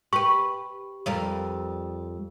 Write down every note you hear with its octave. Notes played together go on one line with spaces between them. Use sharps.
G4 B4 C#6
F2 G3 A#4